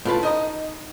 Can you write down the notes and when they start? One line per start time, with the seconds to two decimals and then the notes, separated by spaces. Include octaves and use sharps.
0.05 A2 F4 B4 A5
0.23 D#4 D#5 A#5